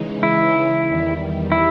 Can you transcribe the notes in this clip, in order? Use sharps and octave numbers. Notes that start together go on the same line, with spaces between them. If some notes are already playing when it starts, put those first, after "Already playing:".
Already playing: C#3 E3 G#3 D#4
E4
E2 D#3 G3
E4